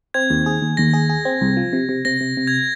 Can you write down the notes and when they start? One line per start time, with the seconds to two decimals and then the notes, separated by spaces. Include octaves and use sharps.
0.14 C4 G#6
0.30 D#2
0.46 G#4
0.62 D#2
0.77 D#2 A#6
0.93 G#4
1.10 G#4
1.25 C4
1.41 C2
1.57 F3
1.73 C3
1.89 C3
2.05 C3 A#6
2.21 C3
2.37 C3
2.47 G#6